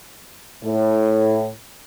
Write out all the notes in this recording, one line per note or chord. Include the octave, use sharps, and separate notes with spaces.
A2